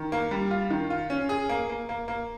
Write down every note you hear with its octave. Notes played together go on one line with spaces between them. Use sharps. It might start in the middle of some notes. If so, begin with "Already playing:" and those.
Already playing: D#3
A#3
G3
F4
D#3
F4
C#4
G#4
A#3
A#3
A#3
A#3